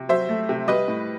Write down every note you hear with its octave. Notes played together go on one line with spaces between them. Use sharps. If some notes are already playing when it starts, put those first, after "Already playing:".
Already playing: C3
F#3 C5 E5
A3
C3
G3 B4 D#5
A2